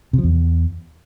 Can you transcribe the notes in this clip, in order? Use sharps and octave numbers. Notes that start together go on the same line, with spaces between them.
C3
F3
E2